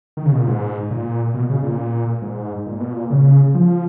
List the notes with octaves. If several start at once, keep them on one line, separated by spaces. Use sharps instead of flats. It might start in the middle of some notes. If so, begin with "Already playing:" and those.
D#3
C#3
B2
A#2
G#2
A#2
B2
C#3
A#2
G#2
A#2
B2
A#2
C#3
F3